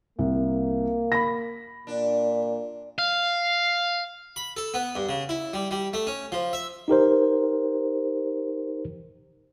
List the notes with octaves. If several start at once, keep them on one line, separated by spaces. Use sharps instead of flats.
C2 A#3
B5 A#6
A#2 D4
F5
B5
A4
B3
G2
C#3
E4
G3
G3
A3
C#4
F3
E5
D#4 G4 A#4 C5